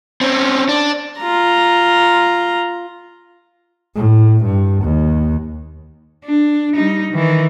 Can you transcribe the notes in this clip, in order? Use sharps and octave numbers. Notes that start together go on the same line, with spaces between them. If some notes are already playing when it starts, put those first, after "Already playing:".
C4 C#4
D4
F4 A#5
A2
G2
D#2
D4
G3 D#4
D#3 E3